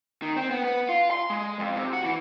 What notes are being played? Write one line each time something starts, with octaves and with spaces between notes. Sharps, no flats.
D#3
C4
B3
B3
F4
C6
G#3
F2
C3
F#4
E3